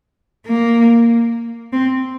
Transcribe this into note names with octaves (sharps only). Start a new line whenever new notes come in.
A#3
C4